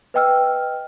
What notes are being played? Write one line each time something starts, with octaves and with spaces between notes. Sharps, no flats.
B4 D#5 G5 E6 F6